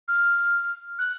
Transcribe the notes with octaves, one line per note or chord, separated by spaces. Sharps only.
F6
F#6